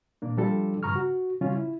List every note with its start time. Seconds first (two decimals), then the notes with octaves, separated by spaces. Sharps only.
0.22 A#2 A#3 D4
0.37 F3 G3 D4 F4 G4 A4
0.83 G2 C#3 A#5 C#6 F6
0.96 F#4
1.41 C#3 F#3 G3 C#4 F4
1.55 E4